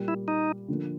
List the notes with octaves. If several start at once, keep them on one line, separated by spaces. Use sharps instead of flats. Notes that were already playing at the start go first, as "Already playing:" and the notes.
Already playing: A#2 G3 A#3
E4
D#4
D3 F3 A#3